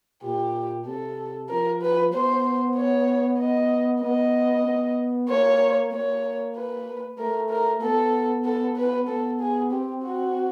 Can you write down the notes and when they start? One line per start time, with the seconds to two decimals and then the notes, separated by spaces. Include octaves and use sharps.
0.23 A#2 G4
0.86 C3 A4
1.49 F3 A#4
1.82 B4
2.12 B3 C5
2.76 C#5
3.39 D#5
4.02 B3 D#5
4.66 B3
5.29 A#3 C#5
5.92 A#3 C#5
6.56 B4
7.19 A3 A#4
7.50 A#4
7.82 B3 A4
8.45 A4
8.77 B4
9.08 B3 A4
9.40 G#4
9.71 C4 G4
10.03 F#4